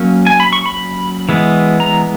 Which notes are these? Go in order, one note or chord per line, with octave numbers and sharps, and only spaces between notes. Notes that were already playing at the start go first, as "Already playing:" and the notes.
Already playing: F#3 A#3 C#4
G#5
B5
C#6
B5
E3 G#3 B3
A#5